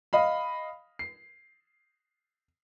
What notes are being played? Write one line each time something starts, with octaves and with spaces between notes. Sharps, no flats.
D#5 F5 B5
C7